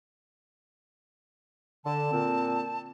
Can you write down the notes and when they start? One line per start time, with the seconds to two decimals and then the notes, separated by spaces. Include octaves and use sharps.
1.85 D3 A5
2.12 A#2 C4